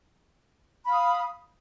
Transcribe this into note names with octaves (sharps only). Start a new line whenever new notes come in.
F5 B5 D#6